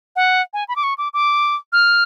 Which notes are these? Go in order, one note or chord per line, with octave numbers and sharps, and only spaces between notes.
F#5
G#5
B5
D6
C#6
D6
D6
F6